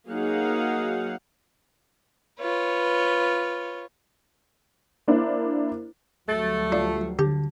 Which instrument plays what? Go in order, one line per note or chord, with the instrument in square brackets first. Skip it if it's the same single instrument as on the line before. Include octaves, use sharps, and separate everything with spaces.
[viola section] F#3 A#3 D#4 G#4 F5 F#5
[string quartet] F4 B4 C#5
[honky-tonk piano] A#3 D4 E4 C5
[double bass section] D2 F#3 G3 [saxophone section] A3 [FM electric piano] A6
[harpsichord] D4 [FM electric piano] F4
[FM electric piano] D3 [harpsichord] G4